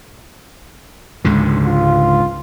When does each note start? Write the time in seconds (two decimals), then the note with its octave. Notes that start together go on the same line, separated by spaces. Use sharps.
1.25 C#2 G#2 D3
1.65 F4